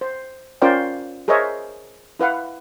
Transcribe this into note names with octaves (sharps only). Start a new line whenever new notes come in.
C5
C#4 F4 A#4 C5 D5 G5
G#4 A#4 C5 C#5 D#5 E5
E4 B4 F5 F#5